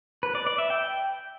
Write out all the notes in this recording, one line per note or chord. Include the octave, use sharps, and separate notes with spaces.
B4
D5
D5
E5
G5